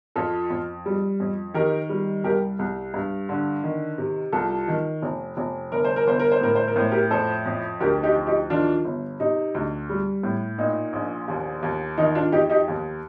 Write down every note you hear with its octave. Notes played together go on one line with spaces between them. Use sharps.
F2 F4 A4
F2
G3
F2
D#3 G4 A#4
G3
C2 G4 A#4
C2
G2
D3
D#3
C3
C2 F4 A4
D#3
F1
F1
G1 A#4
C5
A#4
G1 C5
A#4
C5
A2 A#4
C5
A#4
A2 C5
G4 A#4
F2 A4 C5
F2
D2 G4 A#4
D#4 G4
F3
D#4 G4
D#3 D4 F4
G1
C3 D#4
D2
G3
A2
A#2 D#4
A#1
D#2
D#2
D#3 D#4
D4 F4
F2 D#4 G4
D#4 G4
D#2